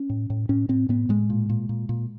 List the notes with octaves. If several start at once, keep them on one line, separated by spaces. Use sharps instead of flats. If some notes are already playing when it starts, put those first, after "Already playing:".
Already playing: C#4
A2
A2
A2 C#4
A2 C4
A2 B3
A2 G#3
A#2
A#2
A#2
A#2